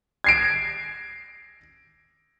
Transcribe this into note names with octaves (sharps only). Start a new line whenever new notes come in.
G#6 C7 D7